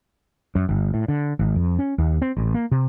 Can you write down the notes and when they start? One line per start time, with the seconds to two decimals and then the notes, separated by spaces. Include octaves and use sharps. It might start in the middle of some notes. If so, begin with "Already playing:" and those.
0.55 F#2
0.69 G1
0.94 A2
1.08 D3
1.39 G#1
1.55 F2
1.79 C#4
1.98 D#2
2.22 C4
2.37 A1
2.54 A#3
2.71 C3